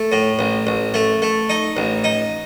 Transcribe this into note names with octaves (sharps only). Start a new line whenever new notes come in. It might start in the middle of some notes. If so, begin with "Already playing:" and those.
Already playing: A3
A2
A1
A1
A3
A3
D#4
A1
D#4